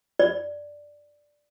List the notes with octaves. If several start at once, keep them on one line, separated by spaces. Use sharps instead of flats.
D5